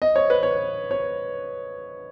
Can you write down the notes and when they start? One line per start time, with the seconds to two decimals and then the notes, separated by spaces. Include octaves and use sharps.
0.02 D#5
0.16 C#5
0.30 B4
0.43 C#5
0.91 C#5